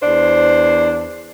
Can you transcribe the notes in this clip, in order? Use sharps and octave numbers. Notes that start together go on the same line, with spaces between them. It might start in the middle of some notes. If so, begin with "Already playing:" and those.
E2 D4 C5